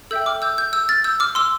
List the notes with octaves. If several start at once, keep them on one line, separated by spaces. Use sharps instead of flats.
A4 E5 G5 E6 G6
D6 F6
E6 G6
E6 G6
E6 G6
F6 A6
E6 G6
D6 F6
C6 E6